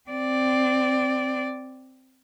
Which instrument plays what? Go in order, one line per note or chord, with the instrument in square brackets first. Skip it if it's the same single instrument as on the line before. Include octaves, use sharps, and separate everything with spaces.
[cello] C4 D5